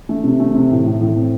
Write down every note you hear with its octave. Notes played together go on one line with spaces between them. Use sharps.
A3
C3
A3
C3
A2
A2
A2
C4